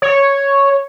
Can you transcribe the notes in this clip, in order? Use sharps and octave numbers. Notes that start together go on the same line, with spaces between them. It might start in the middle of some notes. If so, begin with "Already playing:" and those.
C#5